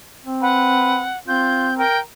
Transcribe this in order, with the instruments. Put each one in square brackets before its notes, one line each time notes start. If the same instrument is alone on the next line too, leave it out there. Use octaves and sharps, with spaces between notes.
[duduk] C4
[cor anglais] B4 [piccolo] F#5
[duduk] C4 [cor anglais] F4 [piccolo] G6
[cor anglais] A#4 [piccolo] G5